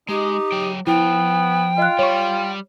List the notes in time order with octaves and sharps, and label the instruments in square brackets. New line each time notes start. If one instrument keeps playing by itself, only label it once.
[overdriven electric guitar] G#3 [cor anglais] D#4 [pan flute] G4
[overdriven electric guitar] F#3 G5
[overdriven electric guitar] F3 [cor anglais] B3 [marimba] E4 [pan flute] G5
[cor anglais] F4 [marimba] D#5 F#6
[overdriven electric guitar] G3 [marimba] C#5 C#6